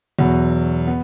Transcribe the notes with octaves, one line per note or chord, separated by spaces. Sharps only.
E2 B2 F#3
B3